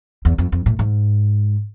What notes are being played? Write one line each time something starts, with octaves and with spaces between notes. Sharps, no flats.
E2
F2
F2
A2
G#2